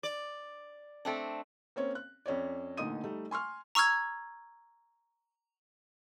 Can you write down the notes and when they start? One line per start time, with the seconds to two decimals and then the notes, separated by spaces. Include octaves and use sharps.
0.03 D5
1.05 A3 C4 D4
1.76 A#3 C4 C#4 C#5
1.95 F#6
2.26 F2 C#4 C#5 D5
2.77 A1 A#2 D3 D#4 D#6 D#7
3.04 G3 A3 D#4
3.31 G#5 C6 C#6 F6
3.75 A#5 C#6 E6 F6 G#6